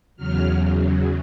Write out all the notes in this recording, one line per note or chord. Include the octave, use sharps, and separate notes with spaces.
E2 C#3 F#3 F6